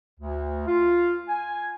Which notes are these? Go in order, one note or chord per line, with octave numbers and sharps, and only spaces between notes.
D2
F4
G#5